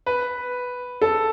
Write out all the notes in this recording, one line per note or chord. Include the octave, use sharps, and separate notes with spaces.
B4
A4